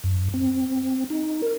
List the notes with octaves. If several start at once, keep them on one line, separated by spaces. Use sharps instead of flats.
F#2
C4
D#4
A#4